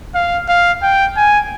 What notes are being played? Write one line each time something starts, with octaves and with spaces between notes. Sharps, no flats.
F5
F5
G5
G#5